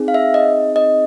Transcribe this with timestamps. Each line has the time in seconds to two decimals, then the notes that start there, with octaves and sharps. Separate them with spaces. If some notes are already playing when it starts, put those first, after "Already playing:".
Already playing: C4 D#4 G#4
0.08 F5
0.14 E5
0.34 D#5
0.76 D#5